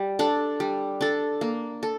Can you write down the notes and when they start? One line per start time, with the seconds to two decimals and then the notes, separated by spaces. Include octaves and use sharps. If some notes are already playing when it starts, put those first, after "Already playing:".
Already playing: G3
0.19 D4 A4
0.60 G3
1.01 D4 A4
1.41 A#3
1.83 A4